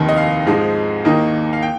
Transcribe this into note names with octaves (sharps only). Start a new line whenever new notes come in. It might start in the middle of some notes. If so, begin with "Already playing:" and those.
Already playing: F1 D#2 D#3
D#5
F5
G#2 F3 G#3 D#4
D#2 D#3 A#3 D#4
F5
G5